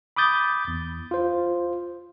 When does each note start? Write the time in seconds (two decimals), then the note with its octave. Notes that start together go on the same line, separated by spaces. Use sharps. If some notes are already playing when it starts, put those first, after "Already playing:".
0.16 B5 D6 D#6 G6 A6
0.68 E2
1.11 F4 C5